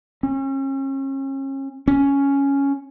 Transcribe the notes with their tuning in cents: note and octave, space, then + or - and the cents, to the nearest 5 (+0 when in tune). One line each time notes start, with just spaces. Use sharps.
C#4 -35
C#4 +5